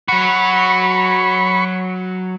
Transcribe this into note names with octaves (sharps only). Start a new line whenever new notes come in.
F#3 F#4 B5 C#6